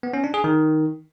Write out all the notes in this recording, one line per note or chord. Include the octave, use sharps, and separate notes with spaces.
B3
C#4
D4
G#4
D#3